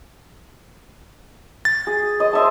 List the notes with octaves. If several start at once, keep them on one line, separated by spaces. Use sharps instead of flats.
A6
G#4
D#5
C5 E5 A5